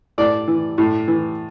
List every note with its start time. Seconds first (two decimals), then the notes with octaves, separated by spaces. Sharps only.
0.18 A2 D5
0.48 E3
0.78 A2
1.08 E3